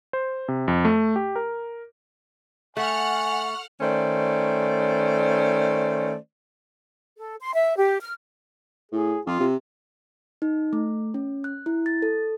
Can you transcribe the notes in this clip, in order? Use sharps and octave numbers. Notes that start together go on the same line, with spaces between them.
C5
C3
F2
A3
G4
A#4
A3 F#5 G#5 C#6 F6
D#3 A3 C#4 C5 D5
A4
C6
E5
G4
F6
A2 G#4
F2 F4
C3
D#4
A3
C#4
F#6
E4
A6
A4